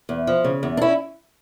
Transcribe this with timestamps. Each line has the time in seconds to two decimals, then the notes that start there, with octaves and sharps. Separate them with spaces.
0.09 E2
0.27 F3
0.44 C#3
0.63 E2
0.77 D4
0.81 C#4 E4